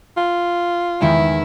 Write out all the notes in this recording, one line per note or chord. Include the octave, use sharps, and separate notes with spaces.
F4
E2 D#3 G#3 E4